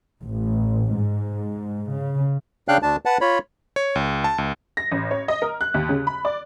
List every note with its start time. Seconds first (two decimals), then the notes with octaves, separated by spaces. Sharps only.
0.24 A1
0.95 G#2
1.93 C#3
2.68 C#3 D4 F5 G5 F#6
2.83 D2 D4 A5
3.05 B4 F#5 A5
3.21 F4 C#5 B5
3.76 C#5
3.95 C#2
4.24 A5
4.38 C#2
4.77 A#6
4.91 A1
5.11 C#5
5.28 D#5
5.42 A#4
5.61 F#6
5.74 D#2
5.89 C#3
6.07 B5
6.25 D5